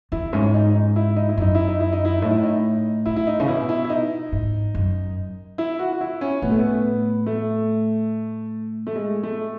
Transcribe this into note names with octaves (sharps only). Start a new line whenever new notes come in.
E2 E4
G#2 C#4
D#4
D#4
E4
D#4
E4
F#2 D#4
E4
D#4
E4
D#4
E4
A2 D#4
E4
D#4
A2 E4
E4
D#4
C#3
B2 E4
E4
E4
D#4
G#2
F#2
E4
F#4
F#4
E4
C#4
A2 B3
A3
B3
A3
A3
G#3
A3